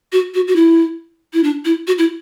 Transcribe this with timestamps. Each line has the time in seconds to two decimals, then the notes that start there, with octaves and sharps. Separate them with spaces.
0.12 F#4
0.35 F#4
0.48 F#4
0.56 E4
1.33 E4
1.43 D4
1.65 E4
1.87 F#4
1.98 E4